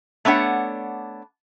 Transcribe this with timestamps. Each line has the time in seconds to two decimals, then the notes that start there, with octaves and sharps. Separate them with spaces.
0.25 A3 B3 D4 C#5 F#5